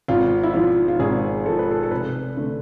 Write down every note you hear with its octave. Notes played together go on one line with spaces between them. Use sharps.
G#1 F4
E4
G#2 F3 F4
F4
G#1 G#4
G#2 F3 A4
B4
A4
A4
F1 B4
D3 A3